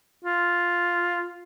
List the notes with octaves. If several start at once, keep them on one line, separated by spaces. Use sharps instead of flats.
F4